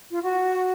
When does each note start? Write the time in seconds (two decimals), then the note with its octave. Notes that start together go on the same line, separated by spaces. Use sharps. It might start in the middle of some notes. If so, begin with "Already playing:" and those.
0.12 F4
0.22 F#4